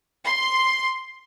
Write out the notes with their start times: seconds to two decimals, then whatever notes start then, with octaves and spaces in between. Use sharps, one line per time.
0.24 C6